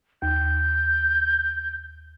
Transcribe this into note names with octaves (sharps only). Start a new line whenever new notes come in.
D#2 G6